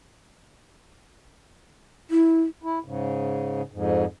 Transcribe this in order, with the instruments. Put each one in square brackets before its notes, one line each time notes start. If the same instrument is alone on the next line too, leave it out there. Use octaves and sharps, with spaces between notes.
[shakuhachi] E4
[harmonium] E4
G#2 C#3
F2 G#2